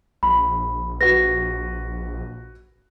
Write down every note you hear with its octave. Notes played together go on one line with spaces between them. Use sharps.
A#1 B5
F#4 B4 A#6